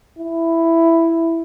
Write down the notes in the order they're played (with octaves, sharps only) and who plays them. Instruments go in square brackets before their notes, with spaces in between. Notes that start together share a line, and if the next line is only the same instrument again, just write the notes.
[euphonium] E4